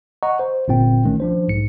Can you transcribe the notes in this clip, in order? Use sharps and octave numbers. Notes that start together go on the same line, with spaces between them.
D#5 F#5 A#5 C#6
C5
G1 A#2 C4 G5
B1 D#3 A3 C#4
F3 D4 C5
B1 G#2 C#7